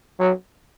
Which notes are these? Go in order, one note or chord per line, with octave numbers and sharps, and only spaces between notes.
F#3